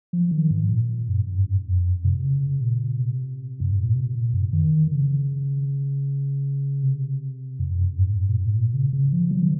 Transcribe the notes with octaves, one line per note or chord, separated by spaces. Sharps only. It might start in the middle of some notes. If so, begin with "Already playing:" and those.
F3
D#3
G#2
A#2
F#2
G#2
F#2
F2
F#2
C3
C#3
A#2
C3
F#2
G#2
A#2
C3
A#2
F#2
D#3
D#3
C#3
C3
F2
F#2
G#2
F#2
A#2
G#2
A#2
C#3
C#3
F3
F#3
D#3